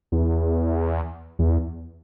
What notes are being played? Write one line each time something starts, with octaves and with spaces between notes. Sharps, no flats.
E2
E2